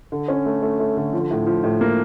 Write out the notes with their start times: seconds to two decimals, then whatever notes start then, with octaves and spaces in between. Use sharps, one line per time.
0.12 D3
0.28 C#4
0.46 A3
0.62 A3
0.79 A3
0.97 D3
1.13 F3
1.31 A2
1.47 F3
1.64 A2
1.81 A#3